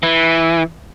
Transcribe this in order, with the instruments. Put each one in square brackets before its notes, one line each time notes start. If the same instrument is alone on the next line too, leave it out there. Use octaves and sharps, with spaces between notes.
[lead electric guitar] E3